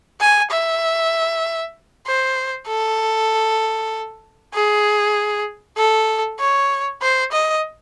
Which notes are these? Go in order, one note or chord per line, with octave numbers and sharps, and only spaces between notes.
G#5
E5
C5
A4
G#4
A4
C#5
C5
D#5